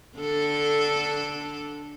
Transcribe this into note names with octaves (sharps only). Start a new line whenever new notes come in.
D3 D4 A4